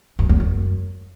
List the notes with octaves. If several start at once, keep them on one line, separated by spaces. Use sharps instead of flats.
F#2
E2
F#2